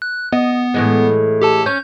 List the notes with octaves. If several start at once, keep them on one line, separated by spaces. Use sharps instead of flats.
F#6
B3 D#5
A2 E3 G#3
G4 A4 A5
C#4 G6